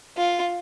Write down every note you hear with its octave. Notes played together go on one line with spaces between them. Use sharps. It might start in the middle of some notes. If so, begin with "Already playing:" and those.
F4